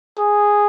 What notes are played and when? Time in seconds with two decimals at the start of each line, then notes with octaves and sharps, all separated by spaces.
0.18 G#4